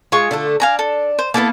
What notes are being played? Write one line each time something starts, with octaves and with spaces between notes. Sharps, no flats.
G#3 F4 C#6
D3 A3 A4
D4 F5 G#5 A#5
A4
C5
A#3 B3 E4 A4 A5